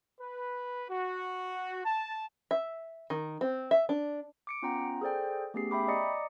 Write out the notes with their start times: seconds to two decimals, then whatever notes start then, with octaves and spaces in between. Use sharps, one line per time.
0.19 B4
0.89 F#4
1.84 A5
2.51 E5
3.10 D#3
3.41 C4
3.71 E5
3.89 D4
4.47 D6 C#7 D7
4.62 B3 C#4 F4 F#5 G5 A#5
5.01 G#4 A4 C5 D5 G5
5.54 A3 B3 C#4 G4 G#4 C7
5.71 E5 G5 B5 D6
5.88 D5 D#5 A#5 D6 D#6 C#7